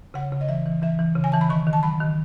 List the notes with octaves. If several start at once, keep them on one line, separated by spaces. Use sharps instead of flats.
C#3 F#5
C#3
D#5
E3 E5
E3
E3 E5
E3
C#3
G#5
E3 A5
B5
D#3 C#6
D#3
A5
F#3 B5
D#3